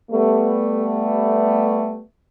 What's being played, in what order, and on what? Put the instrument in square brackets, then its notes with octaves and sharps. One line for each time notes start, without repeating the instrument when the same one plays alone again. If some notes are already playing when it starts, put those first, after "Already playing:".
[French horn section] G3 A3 B3